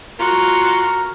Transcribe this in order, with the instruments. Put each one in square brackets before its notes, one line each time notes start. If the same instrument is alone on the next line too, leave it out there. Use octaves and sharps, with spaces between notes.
[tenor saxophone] F4 [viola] F#4 [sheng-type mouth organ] A#4